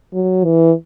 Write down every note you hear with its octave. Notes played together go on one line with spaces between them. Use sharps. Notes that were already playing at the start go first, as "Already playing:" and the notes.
F#3
E3